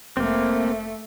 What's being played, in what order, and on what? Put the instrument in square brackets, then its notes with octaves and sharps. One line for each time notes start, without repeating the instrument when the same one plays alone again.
[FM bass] F1 [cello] A3 [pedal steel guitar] A#3 C4